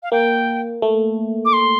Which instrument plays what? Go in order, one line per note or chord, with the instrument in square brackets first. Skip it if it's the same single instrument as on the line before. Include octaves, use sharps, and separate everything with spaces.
[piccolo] F5
[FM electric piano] A#3 [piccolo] G5
[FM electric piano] A3
[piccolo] D6
C6